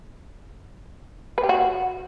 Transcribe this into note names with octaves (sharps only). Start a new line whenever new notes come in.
B4
G4
F#4